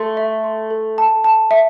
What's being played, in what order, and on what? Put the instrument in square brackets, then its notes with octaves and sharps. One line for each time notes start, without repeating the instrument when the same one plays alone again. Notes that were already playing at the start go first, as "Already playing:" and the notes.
Already playing: [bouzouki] A3 [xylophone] C6
[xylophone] E5
C6
A4
A5
A5
E5